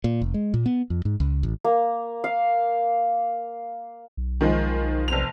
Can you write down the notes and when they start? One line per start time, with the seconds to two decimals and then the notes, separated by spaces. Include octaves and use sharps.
0.04 A#2
0.21 F1
0.34 G#3
0.54 A#2
0.66 B3
0.90 F2
1.05 G#2
1.20 C#2
1.43 A1
1.64 A#3
2.24 F5
4.17 B1
4.41 D#3 F3 G#3
5.08 F1 C4 F7